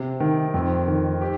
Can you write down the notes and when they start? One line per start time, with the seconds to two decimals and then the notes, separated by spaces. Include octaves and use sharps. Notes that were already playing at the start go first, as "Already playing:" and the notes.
Already playing: C3
0.20 D#3
0.54 F2
0.88 D#3
1.21 G4